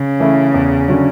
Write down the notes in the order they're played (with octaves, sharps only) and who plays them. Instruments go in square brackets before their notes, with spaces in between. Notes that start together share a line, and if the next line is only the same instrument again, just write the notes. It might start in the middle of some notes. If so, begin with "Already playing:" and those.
Already playing: [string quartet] C#3
[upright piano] E3 A3 C#4 E4
E2
D3 F#3 C#4